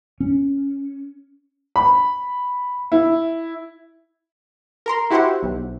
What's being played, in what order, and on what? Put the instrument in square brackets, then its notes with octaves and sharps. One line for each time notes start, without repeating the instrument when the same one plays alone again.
[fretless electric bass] C#4
[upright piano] B5
E4
[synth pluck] A#4 A#5 C6
E4 F#4 G4 C5 E5 F#5
B1